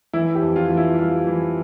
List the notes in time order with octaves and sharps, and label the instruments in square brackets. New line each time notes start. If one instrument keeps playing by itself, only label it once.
[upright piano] E3 E4
G4
F2
F4
E3
E4
G3 F4
E3